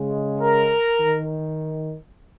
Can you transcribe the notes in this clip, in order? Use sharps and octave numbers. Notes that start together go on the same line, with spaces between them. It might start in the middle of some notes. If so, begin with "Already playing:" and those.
Already playing: C#3 G#3
A#4
D#3